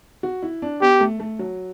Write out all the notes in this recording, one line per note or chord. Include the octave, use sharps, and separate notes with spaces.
F#4
E4
D4
B3 G4
A3
A3
F#3